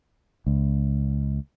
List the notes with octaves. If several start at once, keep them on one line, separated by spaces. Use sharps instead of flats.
C#2